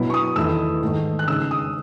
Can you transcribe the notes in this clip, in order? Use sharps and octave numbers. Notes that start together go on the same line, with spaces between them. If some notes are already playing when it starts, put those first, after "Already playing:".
Already playing: B2 F#3 B3 E4
C#6
D#6
E2 D#3 A3 E4 E6
G#2 D#3 A3
F#6
C#3 G#3 D#4 E6
D#6